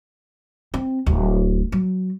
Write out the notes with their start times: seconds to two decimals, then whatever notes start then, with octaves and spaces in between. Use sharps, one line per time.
0.74 C4
1.06 D1
1.72 F#3